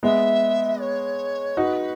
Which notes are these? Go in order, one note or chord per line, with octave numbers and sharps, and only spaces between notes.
G#3 B3 E5
C#5
D#4 F#4 B4